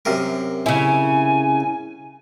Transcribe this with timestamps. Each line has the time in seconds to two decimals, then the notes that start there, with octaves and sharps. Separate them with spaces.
0.05 F#2 C3 A#4
0.66 C#3 E4 G#5